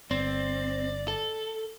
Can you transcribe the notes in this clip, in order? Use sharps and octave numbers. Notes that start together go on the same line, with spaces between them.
G1 C4 D5
A4